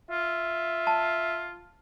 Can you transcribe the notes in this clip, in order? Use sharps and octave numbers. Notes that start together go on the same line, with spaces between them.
F4 E5
A5